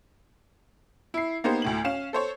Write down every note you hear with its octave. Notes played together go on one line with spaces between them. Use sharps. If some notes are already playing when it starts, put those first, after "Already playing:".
E4 C7
A#3 B3 D#4 G4 C5
D2 A2 F#7
C#4 F5 E7
A4 C5 C#5